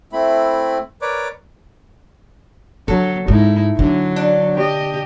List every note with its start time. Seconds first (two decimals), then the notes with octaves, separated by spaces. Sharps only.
0.13 A3 C4 E4 B5
1.02 A#4 B4 C#5 D5 D6
2.88 D3 F#3 A4
3.28 G#2 D#4 E4
3.79 D3 F#3
4.16 D4
4.55 G4 D#5